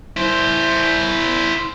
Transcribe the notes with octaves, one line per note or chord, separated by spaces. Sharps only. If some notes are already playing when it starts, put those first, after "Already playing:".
E4 C5